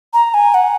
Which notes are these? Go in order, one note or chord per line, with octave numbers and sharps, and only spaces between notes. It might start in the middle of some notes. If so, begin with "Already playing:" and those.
A#5
G#5
F#5